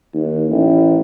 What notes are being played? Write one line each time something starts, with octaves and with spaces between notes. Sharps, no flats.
D#2
A1